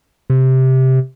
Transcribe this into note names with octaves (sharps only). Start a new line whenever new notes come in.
C3